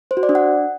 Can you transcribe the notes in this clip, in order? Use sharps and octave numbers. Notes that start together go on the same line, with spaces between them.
C5
F#4
D5
D4
F#5